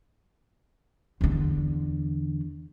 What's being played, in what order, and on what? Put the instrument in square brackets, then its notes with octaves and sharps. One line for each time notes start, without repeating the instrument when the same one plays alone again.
[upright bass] E2 D3